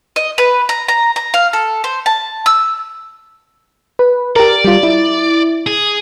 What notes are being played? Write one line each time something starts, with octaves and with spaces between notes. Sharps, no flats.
D#5
B4
A#5
A#5
A#5
F5
A4
C5
A5
E6
B4
G4 A#4 D5
G3 F4
E4
G#4